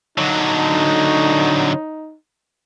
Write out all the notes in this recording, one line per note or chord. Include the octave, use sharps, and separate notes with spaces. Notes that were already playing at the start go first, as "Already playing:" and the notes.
D3 F#3 D#4